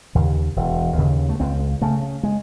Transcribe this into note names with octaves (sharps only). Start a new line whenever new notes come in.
D#2 C#3
E1
D#2 C#3
A3
C#2 C4
C#3 A3
G#3